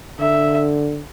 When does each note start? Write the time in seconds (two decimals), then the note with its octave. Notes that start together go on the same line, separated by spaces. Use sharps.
0.19 D3 E5